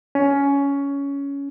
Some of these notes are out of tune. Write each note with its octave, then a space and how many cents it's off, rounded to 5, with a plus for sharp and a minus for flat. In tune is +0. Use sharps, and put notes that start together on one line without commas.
C#4 +15